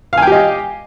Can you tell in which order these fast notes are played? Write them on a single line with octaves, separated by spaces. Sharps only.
F5 G#5 G5 G4 D#5